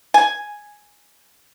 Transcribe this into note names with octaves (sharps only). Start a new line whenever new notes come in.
G#5